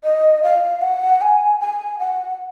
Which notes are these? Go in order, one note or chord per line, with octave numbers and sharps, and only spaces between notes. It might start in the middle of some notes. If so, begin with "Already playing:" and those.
D#5
F5
F#5
G#5
G#5
F#5